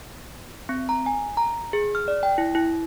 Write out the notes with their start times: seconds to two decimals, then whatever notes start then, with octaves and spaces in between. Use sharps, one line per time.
0.69 C4
0.89 A#5
1.06 G#5
1.37 A#5
1.73 G#4
1.95 F6
2.08 D5
2.23 G5
2.38 E4
2.55 E4